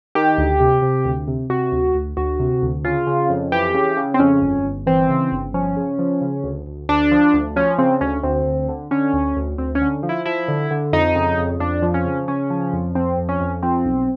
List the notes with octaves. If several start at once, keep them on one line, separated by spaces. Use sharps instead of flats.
D#3 G4
D2
C3
C3
D2
C3
C3 F#4
D2
D2
D2 F#4
C3
D2
C#3 F4
C#3
F2
E3 G4
C#3
C#3
C4
F2 C#4
G1
G1
E3 C4
C#3
G1
F3 C#4
C#3
F3
C#3
D2
D2
D2 D4
F3
D2
F3 C#4
C#3 C4
D2 C#4
D2 C4
D2
D3
D3 C#4
D2
D2
D2 C4
C#4
D3
F3
E4
F3 E4
D3
D3
F2 D#4
C#3
F2
F2 D4
F3
C#4
C#3
C#3 C#4
F3
F2
F3 C4
F2
C#4
F2
F3 C4
B1